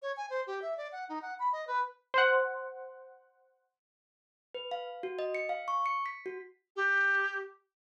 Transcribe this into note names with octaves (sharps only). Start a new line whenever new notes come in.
C#5
G#5
C5
G4
E5
D5
F#5
D#4
F#5
B5
D#5
B4
C5 F#5
B4
F5
F#4
D#5
C#7
F5
C#6
C#7
B6
F#4
G4